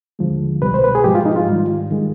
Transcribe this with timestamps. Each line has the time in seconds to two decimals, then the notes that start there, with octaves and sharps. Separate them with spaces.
0.19 D#2 D3 F3 G#3
0.62 C2 B2 G3 B4
0.74 C5
0.84 B4
0.95 G#4
1.04 G#2 F3 G#3 G4
1.15 F4
1.26 D#4
1.36 F4
1.47 G#2 D#3 G3
1.90 D#3 G#3